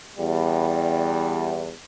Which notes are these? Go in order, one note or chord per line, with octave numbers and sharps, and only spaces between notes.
E2 G3